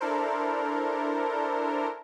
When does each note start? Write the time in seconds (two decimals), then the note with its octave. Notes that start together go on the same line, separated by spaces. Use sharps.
0.01 D4 E4 A4 A#4 C5